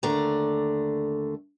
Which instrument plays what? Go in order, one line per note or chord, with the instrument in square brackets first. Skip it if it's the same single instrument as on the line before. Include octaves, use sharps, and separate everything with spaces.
[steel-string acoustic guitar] D#2 D3 A3 D5 A#5